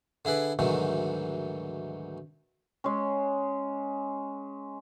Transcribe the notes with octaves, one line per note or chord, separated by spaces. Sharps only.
D3 E4 G#4 B4 D5
D2 G#2 D#3 E3 F#3
G#3 C#4